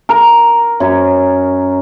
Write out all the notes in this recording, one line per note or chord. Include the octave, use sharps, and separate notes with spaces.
A#4
F#2 C#5